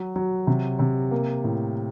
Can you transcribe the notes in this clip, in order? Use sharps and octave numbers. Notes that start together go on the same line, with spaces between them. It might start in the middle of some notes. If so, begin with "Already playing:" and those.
Already playing: F#3
F#3
C3
C3
A#3
A2